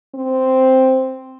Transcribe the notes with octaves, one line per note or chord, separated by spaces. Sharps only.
C4